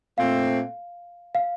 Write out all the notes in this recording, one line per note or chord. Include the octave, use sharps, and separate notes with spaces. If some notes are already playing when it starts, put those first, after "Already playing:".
A#2 A3 C4 F5
F5